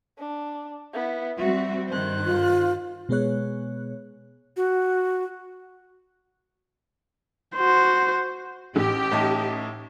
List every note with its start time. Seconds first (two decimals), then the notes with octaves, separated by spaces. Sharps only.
0.19 D4
0.94 B3 E4
1.38 G3 C4 F#4 E5
1.88 G2 D#3 C5 F#6
2.25 F4
3.09 B2 G#3 B3 G#4 C#5 F#6
4.57 F#4
7.56 F#4 C5
8.76 A1 G4
9.11 A2 D#4 A5